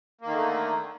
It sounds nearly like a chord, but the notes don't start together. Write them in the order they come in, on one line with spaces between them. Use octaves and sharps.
A#3 D#3 D3 A3